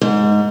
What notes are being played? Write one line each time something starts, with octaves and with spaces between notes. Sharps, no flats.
G#2